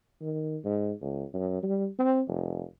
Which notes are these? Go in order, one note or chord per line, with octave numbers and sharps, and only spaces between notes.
D#3
G#2
C#2
F#2
G3
C4
F1